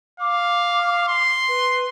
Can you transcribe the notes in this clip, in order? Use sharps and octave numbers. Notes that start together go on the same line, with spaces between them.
F5 D6
C6
B4